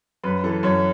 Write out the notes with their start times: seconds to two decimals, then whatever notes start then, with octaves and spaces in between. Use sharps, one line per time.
0.23 F#2 B4
0.44 E3 A4
0.63 F#2 C#5